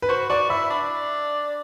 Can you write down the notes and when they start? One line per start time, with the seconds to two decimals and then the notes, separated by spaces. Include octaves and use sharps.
0.02 B4
0.09 F#4 C5
0.29 F#4 D5
0.50 E4 E5
0.70 D4